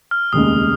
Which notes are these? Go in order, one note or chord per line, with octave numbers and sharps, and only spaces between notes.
F6
F1 D#2 C#3 G#3 D#6